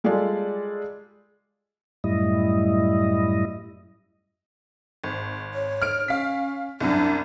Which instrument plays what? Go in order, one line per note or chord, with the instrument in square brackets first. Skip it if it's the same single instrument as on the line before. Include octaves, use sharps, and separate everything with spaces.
[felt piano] G3 G#3 F4 G4 A4 D5
[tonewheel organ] F#2 A2 G3 E4 D#5
[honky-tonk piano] G#1
[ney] C#5
[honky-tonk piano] F6 D7
[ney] C#4 [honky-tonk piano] F5 B6
[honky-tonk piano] C2 F#2 [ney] D4